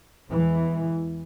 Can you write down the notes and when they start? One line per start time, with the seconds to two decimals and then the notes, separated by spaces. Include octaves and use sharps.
0.28 E2 E3 G#3